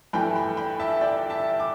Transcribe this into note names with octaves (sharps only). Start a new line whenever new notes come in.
G2 E3 A3 G5 B5
G5 B5
G5 B5
E5 A5
D5 G5
E5 A5
D6